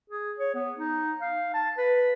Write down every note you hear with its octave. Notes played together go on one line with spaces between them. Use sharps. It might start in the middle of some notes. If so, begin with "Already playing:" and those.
G#4
C#5
B3
D#4
F5
A5
B4